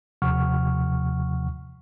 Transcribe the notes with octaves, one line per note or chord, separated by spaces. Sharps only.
D#2 C3 F3 F#5 C#6 F6